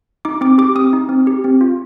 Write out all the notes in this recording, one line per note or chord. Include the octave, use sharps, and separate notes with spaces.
D#4 D6
C4 D6
G4 D6
C4 D#6
D#4
C4
G4
C4
F4